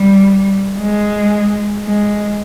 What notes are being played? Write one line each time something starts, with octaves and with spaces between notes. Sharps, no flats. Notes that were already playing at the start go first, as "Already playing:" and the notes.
Already playing: G3
G#3
G#3